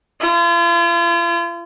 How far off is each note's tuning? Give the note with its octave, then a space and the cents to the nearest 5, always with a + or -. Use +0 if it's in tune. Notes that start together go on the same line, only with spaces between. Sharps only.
F4 -40